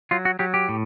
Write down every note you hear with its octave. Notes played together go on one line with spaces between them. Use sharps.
F#3 F4
F#4
F#3 G4
G4
A2